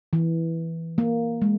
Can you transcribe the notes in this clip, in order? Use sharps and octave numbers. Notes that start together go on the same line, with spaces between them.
E3
A#3
G#3